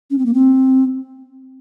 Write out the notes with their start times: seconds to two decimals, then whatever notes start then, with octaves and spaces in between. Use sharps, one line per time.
0.11 C#4
0.18 C4
0.26 A#3
0.34 C4